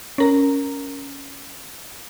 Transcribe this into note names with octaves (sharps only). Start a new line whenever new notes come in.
C#4 A#4 A#5